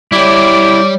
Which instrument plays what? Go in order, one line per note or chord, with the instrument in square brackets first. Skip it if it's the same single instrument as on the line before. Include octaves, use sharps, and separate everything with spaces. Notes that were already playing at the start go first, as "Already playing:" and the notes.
[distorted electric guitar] G3 [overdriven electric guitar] E4 G4 [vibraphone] C#5 D5 [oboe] D6